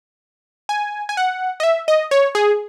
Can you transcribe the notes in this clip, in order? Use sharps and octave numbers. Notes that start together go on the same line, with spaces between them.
G#5
G#5
F#5
D#5
E5
D#5
C#5
G#4